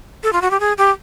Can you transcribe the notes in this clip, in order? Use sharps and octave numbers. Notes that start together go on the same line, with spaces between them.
A4
F4
F#4
G4
G#4
G4